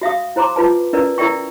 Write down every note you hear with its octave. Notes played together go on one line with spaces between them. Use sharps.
F#4 E5 F5 D#6
E4 C5 A#5 C6 D6
F4 B4 A5
C#4 E4 A#4 B4 D5
E4 A#4 D5 E5 G5 C#6